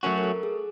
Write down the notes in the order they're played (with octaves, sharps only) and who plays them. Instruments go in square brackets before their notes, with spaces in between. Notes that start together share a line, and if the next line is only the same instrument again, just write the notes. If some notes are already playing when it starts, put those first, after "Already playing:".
[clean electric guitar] F#3 A3 C#4 F#4 [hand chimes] A#4
[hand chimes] A#4
A4
G#4